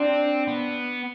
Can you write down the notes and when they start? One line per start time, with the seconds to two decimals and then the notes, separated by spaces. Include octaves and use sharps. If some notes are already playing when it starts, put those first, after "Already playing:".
Already playing: C4 D4
0.47 B3